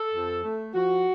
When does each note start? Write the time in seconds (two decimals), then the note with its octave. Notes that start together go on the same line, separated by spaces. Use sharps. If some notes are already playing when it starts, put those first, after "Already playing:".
Already playing: A4
0.13 F2
0.44 A3
0.74 F3 F#4